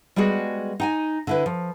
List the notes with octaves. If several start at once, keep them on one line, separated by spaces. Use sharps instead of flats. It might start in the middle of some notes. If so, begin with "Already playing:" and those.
G3 G#3 B3 F#4 G#4
D#4 G5 G#5
D3 E4 B4
F3